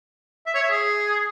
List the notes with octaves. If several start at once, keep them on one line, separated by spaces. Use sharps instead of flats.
E5
C#5
E5
G#4